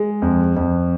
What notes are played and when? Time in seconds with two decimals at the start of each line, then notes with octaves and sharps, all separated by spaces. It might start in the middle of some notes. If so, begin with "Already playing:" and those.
Already playing: G#3
0.22 F2
0.56 F2